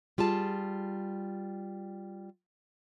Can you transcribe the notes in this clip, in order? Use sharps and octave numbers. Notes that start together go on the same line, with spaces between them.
G3 F4 G#4 A5